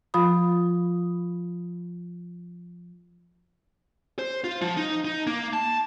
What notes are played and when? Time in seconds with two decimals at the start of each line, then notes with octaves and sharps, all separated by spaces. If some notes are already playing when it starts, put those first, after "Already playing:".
0.14 F3 F4 B5 D#6
4.19 C5
4.44 F4
4.62 F3
4.77 D#4
5.05 D#4
5.27 A#3
5.53 A5